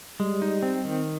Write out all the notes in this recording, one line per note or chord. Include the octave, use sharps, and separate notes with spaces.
G3 G#3
D#4
C4
D#3